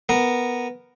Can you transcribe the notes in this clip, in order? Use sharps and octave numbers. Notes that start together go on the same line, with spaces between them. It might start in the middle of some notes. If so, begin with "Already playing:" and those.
B3 A#4